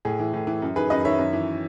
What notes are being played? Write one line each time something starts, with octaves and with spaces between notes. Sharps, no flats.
A2 G#4
E3
A2
E3
F#2
D#3 G#4 B4
F#2 B4 D#5
D#3 C#5 E5
F#2
E3